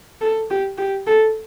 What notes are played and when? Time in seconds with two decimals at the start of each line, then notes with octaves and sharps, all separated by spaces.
0.21 A4
0.50 G4
0.78 G4
1.07 A4